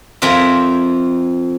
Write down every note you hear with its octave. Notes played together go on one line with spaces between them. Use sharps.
F2 C4 A#4 E5